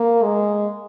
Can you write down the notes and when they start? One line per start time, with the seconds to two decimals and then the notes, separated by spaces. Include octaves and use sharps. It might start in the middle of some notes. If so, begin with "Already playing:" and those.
Already playing: A#3
0.23 G#3